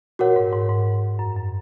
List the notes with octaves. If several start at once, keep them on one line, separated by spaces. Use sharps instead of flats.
A#2 F#4 A#4 C#5 F#5
G#2
G#2
G#2
F#2
F#2